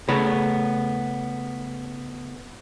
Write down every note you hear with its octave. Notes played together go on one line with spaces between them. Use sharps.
C#3 A3 B3 C#5 A#5 B5